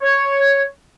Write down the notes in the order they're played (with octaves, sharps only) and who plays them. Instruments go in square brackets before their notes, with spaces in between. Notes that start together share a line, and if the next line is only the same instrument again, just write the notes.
[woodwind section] C#5